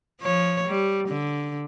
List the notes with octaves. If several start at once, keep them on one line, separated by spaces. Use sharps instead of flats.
F3 C#5
G3
D3